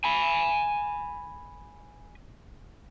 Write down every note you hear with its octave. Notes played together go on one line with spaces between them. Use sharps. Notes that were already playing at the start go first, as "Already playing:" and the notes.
G#5 B5